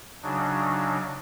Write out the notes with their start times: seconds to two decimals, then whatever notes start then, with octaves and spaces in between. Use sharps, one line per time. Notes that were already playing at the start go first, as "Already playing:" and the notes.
0.23 C#3 F#3 D4 D#4